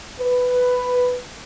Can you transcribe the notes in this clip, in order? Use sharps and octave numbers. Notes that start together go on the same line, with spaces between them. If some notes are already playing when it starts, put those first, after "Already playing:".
B4